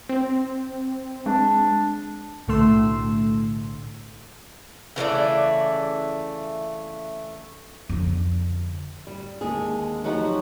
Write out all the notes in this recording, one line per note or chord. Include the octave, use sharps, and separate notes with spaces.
C4
G#3 D4
B1 A2 D3 A3 C6 E6
C#3 E3 A3 D5
F2 D3
G3
D#2 D3 G#3 G#4
F3 F#3 B3 D#4 F#4 G4